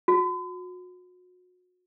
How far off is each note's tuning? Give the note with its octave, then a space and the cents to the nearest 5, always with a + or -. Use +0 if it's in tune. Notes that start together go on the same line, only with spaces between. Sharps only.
F#4 -35